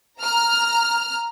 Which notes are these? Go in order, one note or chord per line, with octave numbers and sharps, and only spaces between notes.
A#5 F6